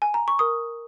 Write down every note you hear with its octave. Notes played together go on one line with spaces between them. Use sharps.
G#5
A#5
C#6
A#4 D#6